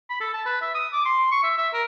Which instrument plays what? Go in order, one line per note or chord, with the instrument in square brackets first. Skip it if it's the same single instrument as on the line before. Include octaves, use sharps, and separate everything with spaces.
[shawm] B5
A4
A5
B4
E5
D#6
D6
C6
C#6
E5
E5
A#4